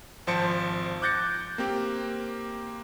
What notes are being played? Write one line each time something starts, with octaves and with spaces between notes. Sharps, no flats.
G#1 F3 C5 A5 C#7 D7
D6 F#6 G6 A6 A#6 C#7
A#3 C4 G4